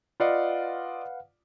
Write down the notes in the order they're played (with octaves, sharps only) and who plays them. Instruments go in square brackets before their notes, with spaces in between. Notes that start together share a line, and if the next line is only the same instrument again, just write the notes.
[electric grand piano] F4 D5 D#5 [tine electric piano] B4 F5 F#5